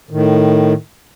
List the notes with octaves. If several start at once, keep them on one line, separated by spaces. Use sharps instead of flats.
A2 D#3